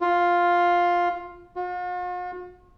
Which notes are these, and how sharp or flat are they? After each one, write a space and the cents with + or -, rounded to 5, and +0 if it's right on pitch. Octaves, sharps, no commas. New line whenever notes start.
F4 +5
F4 +45